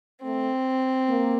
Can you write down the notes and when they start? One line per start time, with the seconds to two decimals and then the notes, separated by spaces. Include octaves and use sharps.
0.24 A3 C4
1.09 A#3